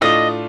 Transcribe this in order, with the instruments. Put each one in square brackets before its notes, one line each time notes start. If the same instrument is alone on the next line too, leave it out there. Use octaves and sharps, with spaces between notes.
[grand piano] A2 A3 D4 F4 [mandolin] D#5